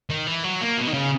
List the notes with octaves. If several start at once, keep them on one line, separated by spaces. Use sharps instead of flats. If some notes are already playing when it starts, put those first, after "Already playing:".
D#3
E3
F#3
A#3
B2
D#3
C#3